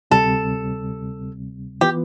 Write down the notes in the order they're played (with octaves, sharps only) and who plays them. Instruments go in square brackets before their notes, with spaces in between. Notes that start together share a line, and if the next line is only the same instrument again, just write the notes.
[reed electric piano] D2 C3 G3 C4 [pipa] A4
[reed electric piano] E3 B3 F4 B4 [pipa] G4